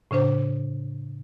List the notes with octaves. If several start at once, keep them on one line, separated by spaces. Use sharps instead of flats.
A2 C#3 D4 C5